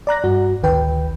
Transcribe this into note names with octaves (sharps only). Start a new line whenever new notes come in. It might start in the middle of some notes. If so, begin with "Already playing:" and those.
D5 A#5 F#6 A#6
G2 F#4
A1 D2 D#3 B4 G5